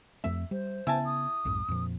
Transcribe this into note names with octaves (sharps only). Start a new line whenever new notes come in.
F2 A3 C4 E5
G3 C5
C#3 B3 E4 G#5 A5
D#6
B1 F2 G#2
F2 A#2 F3